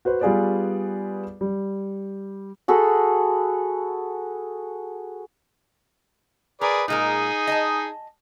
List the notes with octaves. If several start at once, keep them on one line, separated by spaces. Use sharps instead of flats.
F#4 B4 C5
G3 B3 F4 G#4 B4 D5
G3
F#4 G#4 A4 B5
G#4 A#4 B4 D5
A#2 G#3 D#4 G#4 A#4
D#5 G#5 A5